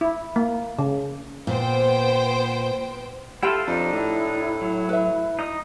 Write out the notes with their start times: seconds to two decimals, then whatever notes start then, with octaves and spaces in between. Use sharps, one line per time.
0.01 E4
0.36 A#3
0.79 C#3
1.47 A#2 B3 C5 G5
3.43 E4 F4 G4 A4 G5
3.67 F2 D4 D#4
3.92 A2 E4
4.61 F#3
4.89 B4 E5
5.39 D#4 D#5 D#6